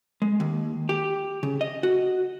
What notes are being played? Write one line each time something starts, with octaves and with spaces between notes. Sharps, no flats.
G#3
D#2
G4
C#3
D#5
F#4